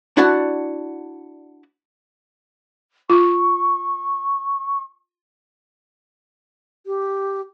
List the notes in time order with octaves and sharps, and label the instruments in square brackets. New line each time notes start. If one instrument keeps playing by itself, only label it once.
[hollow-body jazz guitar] D4 E4 F#4 D5 F#5 A5
[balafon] F4 [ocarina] C#6
[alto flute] G4